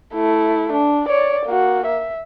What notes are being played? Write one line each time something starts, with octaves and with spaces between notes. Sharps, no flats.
A3 E4
D4
C#5 D5
A#3 F#4
E5